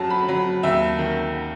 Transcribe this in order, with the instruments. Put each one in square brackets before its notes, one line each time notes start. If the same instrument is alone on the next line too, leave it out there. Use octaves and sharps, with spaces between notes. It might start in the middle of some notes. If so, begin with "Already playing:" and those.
Already playing: [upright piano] F#2 F#3 A5
B5
F#3 B5
D#2 E5
D#3